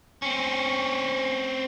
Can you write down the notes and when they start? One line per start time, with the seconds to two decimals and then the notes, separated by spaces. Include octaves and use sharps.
0.22 C4 C#4